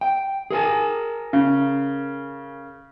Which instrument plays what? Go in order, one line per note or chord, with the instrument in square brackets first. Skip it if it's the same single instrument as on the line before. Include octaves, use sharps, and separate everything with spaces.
[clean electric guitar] G5
G#4 A#4 G#5
[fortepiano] C#3